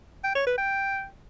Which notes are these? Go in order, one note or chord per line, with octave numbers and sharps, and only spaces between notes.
G5
C#5
B4
G5